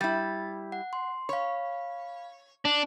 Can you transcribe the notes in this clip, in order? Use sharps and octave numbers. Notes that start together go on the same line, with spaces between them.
G3 E4 A6
F#5
C6
C#5 F5 B5
D4